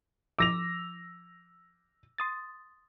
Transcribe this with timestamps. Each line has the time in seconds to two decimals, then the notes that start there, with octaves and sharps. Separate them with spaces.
0.39 F3 D6 E6 A#6 F7
2.18 C6 D#6 A6